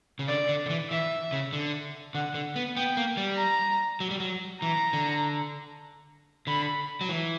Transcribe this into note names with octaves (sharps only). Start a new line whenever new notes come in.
C#3
D3 D5
D3
D3
E3
E3 E5
C#3
D3
D3 F#5
D3
B3
B3 G5
A#3
G3
A#5
F#3
G3
F#3
E3 A#5
D3
D3 B5
F#3
E3